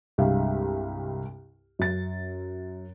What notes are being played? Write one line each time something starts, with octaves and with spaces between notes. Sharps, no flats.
C2 G2 G#3 G4 F5
F#2 A6